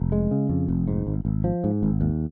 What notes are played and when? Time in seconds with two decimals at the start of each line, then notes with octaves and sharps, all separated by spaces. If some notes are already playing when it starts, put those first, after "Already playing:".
Already playing: F1
0.12 G#3
0.31 C#3
0.49 F2
0.68 F1
0.88 G#2
1.07 G#1
1.25 G#1
1.44 F3
1.64 G#2
1.83 G#1
2.01 D#2